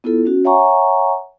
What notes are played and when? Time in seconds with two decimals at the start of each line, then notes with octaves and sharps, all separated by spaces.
0.04 B3 E4 F4 A4
0.25 C#4 F#4
0.45 C#5 E5 F#5 G#5 A#5 C#6